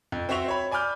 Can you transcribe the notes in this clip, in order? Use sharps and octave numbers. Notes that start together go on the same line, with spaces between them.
F2
C4 F#4 C5 E5 C#6 F7
C#5 B5
D5 G#5 B5 D6 F6 G6